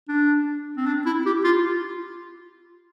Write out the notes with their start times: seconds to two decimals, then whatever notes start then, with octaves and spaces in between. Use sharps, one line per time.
0.09 D4
0.77 C4
0.86 D4
1.06 E4
1.26 G4
1.44 F4